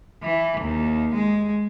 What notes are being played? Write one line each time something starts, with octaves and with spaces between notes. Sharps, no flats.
E3
D#2
G#3